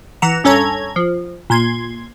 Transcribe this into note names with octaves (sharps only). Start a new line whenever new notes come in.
E3 F#5 A#5 E7
G2 C#4 A4 C#5 A#5 G#6
F3
A#2 C6 G#6